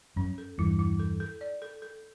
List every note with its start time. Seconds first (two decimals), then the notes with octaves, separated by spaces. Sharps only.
0.16 F#2 C#4
0.38 A4
0.58 E2 G2 E4
0.79 E4
0.99 A4
1.20 A4
1.41 D5
1.62 A4
1.82 A4